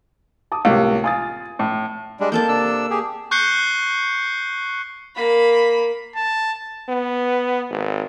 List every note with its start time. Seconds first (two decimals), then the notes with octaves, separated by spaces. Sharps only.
0.52 A5 D6 D#6
0.65 C#2 A2 C3 A#3
1.04 F4 G#5 D#6 A6
1.59 A2
2.20 G3 G#3 D4
2.32 A#3 A4 A5 G6
2.49 C3 D4 E6
2.90 G4 G#4
3.31 C#6 F#6 G6 C7 C#7 G7
5.16 A#3 B5
6.16 A5
6.89 B3
7.70 G#1